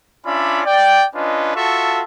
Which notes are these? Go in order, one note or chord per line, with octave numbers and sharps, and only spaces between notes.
C#4 D4 F4 D5 E5 B5
D5 G5
C#4 D4 F4 B4 D#5
F4 F#4 A4 E5 A5 C#6